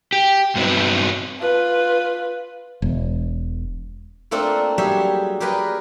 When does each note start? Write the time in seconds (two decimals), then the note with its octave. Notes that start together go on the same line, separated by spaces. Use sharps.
0.13 G4
0.55 G2 F#3 B3 C4 D#4
1.40 F4 B4
2.82 E1
4.31 A3 A#3 C4 D4 F4 A4
4.78 F#3 G3 G4 G#4 C#5 E5
5.40 G4 G#4 A#4 B4 D5 G5